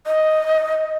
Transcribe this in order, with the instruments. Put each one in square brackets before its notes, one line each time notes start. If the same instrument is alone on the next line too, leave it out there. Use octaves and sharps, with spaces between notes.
[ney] D#5